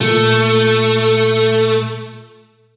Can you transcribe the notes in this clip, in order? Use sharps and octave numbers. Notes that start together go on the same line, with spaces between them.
A#2 A3